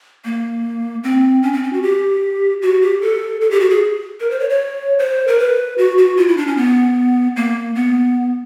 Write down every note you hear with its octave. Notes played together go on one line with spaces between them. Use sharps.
A#3
C4
C#4
C4
C#4
F#4
G4
F#4
G4
A4
A4
G4
F#4
G#4
A#4
C5
C#5
C#5
C5
A#4
B4
F#4
F#4
F4
E4
D4
C#4
B3
A#3
B3